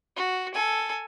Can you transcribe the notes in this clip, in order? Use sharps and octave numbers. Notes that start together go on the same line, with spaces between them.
F#4
A4 G#5